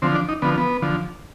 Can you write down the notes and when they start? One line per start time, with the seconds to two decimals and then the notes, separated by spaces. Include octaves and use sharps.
0.02 D3 F3 C4
0.15 D4
0.29 D#4
0.42 D3 F3 B3
0.58 B3
0.82 D3 F3